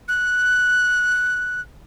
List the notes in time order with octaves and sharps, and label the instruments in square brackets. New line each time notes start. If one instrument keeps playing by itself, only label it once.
[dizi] F#6